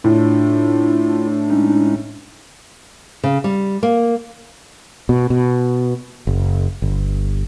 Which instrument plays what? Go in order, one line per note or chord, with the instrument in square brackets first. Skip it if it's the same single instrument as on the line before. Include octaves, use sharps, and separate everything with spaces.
[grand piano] A2 [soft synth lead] D4 [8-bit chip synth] F4
[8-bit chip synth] G#3 C#4 D#4
[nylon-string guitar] C#3
G3
A#3
[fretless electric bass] B2
B2
F#1
G1